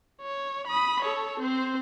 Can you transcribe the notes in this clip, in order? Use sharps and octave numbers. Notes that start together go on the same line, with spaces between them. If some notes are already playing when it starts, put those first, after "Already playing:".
C#5
B5 D#6
A4 C#5
C4 C5